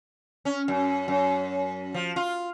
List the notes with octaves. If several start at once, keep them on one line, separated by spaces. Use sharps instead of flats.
C#4
F#2
F#2
F3
F4